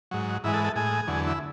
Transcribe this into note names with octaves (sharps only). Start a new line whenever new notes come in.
G#2 F#3
G#2 E3 G#3 E4
A4
A4
A2 G#3 G#4
E2 D3 F#3
E4